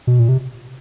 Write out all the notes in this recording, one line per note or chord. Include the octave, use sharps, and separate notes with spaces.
B2
A#2
C3